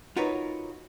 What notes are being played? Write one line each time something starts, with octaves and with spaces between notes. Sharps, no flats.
D#4 F4 F#4 A#4 B4 C#5